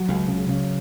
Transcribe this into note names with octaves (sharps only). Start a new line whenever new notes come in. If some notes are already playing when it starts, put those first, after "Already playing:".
Already playing: F#3
C#2
C#3
C#3